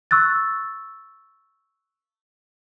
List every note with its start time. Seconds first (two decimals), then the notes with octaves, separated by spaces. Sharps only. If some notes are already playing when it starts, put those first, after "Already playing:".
0.11 C#6 E6 F#6 A6